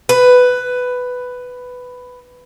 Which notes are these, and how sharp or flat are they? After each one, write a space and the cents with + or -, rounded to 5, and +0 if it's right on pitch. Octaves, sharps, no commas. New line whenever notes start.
B4 +10